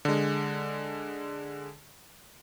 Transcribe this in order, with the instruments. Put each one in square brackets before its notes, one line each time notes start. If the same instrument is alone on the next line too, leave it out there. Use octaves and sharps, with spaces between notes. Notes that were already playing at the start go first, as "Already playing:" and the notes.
[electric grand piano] D3 G#3